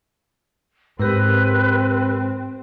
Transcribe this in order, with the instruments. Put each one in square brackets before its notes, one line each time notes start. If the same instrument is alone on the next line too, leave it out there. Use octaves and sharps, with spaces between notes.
[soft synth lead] G#2 [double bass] C4 [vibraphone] G4 A#4 E6 [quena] B4